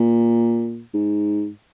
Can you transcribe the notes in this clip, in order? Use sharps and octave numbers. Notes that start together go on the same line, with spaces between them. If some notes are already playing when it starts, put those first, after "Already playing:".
Already playing: A#2
G#2